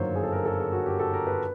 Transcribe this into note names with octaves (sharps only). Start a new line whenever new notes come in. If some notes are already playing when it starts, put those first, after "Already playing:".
Already playing: G1 F#2 D#3 F#3 A#3 C5 C#5
G#4
A4
A#4
A4
G#4
F#4
G4
A4
A#4
B4